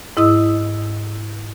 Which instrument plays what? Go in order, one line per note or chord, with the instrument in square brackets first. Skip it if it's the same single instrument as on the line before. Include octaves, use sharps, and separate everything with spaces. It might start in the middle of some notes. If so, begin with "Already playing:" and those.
[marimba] G#2 E4 D#5 D#6 E6